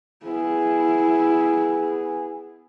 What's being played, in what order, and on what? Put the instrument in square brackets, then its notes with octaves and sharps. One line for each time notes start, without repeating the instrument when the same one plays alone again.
[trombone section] B3 G#4 [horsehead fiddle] E4